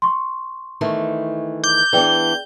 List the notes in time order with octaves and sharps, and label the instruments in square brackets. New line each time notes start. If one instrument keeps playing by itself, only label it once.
[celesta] C6 C#6
[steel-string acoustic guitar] D#3 E3 A3
[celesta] D6 [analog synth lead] G6
[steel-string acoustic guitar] E3 B3 D4 [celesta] G#4 D5 G5